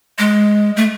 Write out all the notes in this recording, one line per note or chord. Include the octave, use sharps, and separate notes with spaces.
G#3
A3